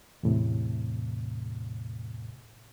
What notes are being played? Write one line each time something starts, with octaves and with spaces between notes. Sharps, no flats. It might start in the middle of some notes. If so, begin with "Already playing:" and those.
E2 A2 C3